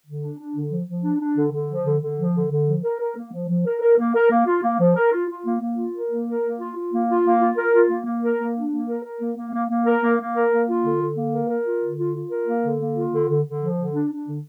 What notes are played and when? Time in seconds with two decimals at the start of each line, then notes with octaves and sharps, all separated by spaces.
0.06 D3
0.22 D4
0.38 D4
0.54 D3
0.70 F3
0.87 F3
1.02 D4
1.20 D4
1.36 D3
1.51 D3
1.69 F3
1.84 D3
2.01 D3
2.18 F3
2.34 D3
2.50 D3
2.67 F3
2.83 A#4
3.00 A#4
3.16 A#3
3.32 F3
3.48 F3
3.65 A#4
3.81 A#4
3.97 A#3
4.14 A#4
4.30 A#3
4.46 F4
4.62 A#3
4.79 F3
4.95 A#4
5.12 F4
5.29 F4
5.44 A#3
5.60 A#3
5.76 F4
5.93 A#4
6.10 A#3
6.26 A#4
6.43 A#3
6.59 F4
6.76 F4
6.92 A#3
7.08 F4
7.24 A#3
7.40 F4
7.57 A#4
7.73 F4
7.89 A#3
8.05 A#3
8.22 A#4
8.38 A#3
8.55 D4
8.70 A#3
8.88 A#4
9.03 A#4
9.20 A#3
9.36 A#3
9.53 A#3
9.69 A#3
9.86 A#4
10.02 A#3
10.18 A#3
10.35 A#4
10.51 A#3
10.67 F4
10.84 D3
11.00 D3
11.17 A#3
11.33 A#4
11.49 A#4
11.65 F4
11.82 D3
11.97 F4
12.14 F4
12.30 A#4
12.47 A#3
12.63 D3
12.79 A#3
12.96 F4
13.13 D3
13.29 D3
13.45 D3
13.62 F3
13.78 D3
13.95 D4
14.11 D4
14.26 D3